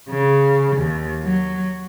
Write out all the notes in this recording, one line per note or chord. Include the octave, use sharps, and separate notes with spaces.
C#3
D#2
F#3